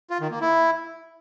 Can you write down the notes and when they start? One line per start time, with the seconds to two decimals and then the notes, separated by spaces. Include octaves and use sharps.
0.10 F4
0.21 D#3
0.31 A#3
0.41 E4